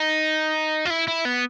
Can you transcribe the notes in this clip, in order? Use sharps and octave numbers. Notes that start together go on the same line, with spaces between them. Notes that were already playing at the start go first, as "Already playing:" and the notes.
Already playing: D#4
F4
E4
E4
B3